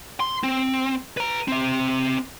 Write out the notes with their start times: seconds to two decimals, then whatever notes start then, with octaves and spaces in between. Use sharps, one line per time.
0.20 C6
0.43 C4
1.17 B4 A#5
1.48 C4 E5